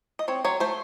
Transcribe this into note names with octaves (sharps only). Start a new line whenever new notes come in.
D#5
C4 C#5
F#3 C#5
A3 C5